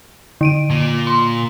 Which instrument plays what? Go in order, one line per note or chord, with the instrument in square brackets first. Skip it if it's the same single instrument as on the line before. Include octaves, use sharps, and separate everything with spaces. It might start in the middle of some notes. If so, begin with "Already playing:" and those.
[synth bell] D3 D7 D#7
[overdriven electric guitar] A#2
[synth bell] C6